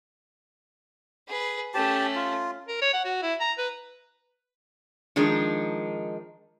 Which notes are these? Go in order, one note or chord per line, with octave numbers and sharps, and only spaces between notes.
G#4 B4
A3 C#4 G4 A5
F4
A#4
C#5
F#5
F#4
E4
A#5
B4
D#3 F3 G#3 D4 D#4